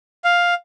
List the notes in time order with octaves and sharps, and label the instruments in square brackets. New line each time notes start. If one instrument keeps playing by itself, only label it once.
[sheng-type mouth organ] F5